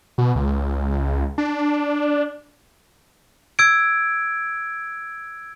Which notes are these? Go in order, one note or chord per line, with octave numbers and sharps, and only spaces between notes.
B2
C#2
D4
E6 G#6 D7